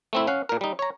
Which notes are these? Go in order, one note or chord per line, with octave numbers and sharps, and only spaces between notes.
A3 C4 E4
C#4 F5 F#5
A#2 A#4
G3 D#4
C#5 A#5